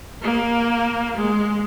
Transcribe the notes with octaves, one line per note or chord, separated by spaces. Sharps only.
A#3
G#3